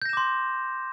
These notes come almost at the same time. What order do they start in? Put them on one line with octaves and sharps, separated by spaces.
G6 A#6 E7 D6 C6